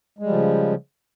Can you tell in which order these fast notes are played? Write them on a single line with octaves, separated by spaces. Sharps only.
G#3 G3 F3 C#3